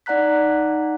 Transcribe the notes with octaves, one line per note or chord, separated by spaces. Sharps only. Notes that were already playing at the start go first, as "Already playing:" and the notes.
D#4 D5 F#5 A#5 F#6 B6